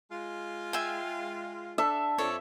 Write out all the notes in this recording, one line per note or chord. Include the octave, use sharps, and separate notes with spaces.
G#3 F4
E5 G5 G#5
D4 A4 E5
F2 A4 C#5 D5